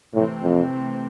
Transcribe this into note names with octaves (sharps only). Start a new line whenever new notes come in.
A2 C3 E3 A3 C4
F2